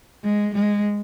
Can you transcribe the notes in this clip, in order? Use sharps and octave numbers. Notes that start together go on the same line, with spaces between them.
G#3
G#3